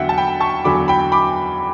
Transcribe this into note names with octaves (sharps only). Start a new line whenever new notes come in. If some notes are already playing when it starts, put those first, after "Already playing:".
Already playing: E2 D3 F#3 E5 F#5 G5
A5
G5 B5
A5 C#6
E2 D3 F#3 B5 D6
G5 B5
B5 D6